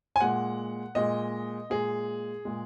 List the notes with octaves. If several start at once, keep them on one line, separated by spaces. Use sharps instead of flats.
G#5
A#2 G#3 F#5
A#2 G#3 D#5
A#2 G#3 G#4
A#2 G#3